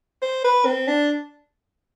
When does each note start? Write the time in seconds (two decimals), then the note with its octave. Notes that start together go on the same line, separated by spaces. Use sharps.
0.22 C5
0.44 B4
0.66 C4
0.88 D4